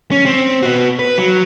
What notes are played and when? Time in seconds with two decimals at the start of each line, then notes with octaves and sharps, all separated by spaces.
0.11 C#4
0.26 C4
0.63 B3 F#4
0.99 B4
1.18 F#3